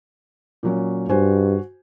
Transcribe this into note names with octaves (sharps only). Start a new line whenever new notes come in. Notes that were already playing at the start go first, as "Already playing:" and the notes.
A#2 F#3 C#4
G2 F#4 C5 G#5